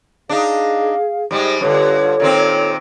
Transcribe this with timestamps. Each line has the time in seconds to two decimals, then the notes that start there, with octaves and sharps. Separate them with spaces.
0.29 D4 D#4 G#4 F5
1.31 G#2 G3 G#3
1.61 G2 A#2 D3 F4 A4 C#5
2.20 A#2 D#3 C4